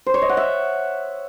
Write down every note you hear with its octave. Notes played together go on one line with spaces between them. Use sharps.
C5
C#5
D#5
F#5
E5